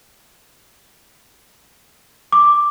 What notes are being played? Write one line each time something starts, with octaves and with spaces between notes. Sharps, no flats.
D6